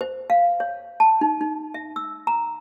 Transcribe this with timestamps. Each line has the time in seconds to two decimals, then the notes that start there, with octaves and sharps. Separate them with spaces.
0.01 C5
0.30 F5
0.60 C#5
1.00 A5
1.21 D#4
1.41 D#4
1.74 E5
1.96 E6
2.27 A#5